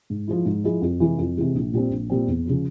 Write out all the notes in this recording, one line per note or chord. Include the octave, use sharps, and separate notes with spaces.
G#2
F3 G#3 E4
G#2
F3 G#3 E4
F2
C3 E3 G#3
F2
C3 E3 G#3
A#1
A#2 G3 C4
A#1
A#2 G3 C4
E2
C#3 F3